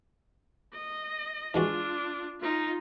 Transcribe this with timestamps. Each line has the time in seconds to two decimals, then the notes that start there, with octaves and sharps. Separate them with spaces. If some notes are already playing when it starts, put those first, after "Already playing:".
0.73 D#5
1.54 E3 G#3 D4 F4 F#4
2.40 D#4 F4